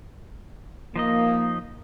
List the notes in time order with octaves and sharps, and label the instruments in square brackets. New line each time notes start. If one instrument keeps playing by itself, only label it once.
[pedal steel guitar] F3 D#4 D#5 [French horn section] A#3